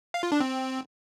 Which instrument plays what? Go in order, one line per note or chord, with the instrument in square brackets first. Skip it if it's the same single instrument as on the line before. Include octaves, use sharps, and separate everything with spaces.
[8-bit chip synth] F5
F4
D4
C4